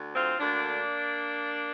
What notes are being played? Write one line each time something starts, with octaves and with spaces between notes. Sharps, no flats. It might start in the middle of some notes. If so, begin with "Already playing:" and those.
Already playing: D2 D3
C4 F4
D2 D3 A#3 D4